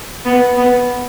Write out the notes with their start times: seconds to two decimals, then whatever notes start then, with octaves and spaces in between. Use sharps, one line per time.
0.25 B3
0.57 B3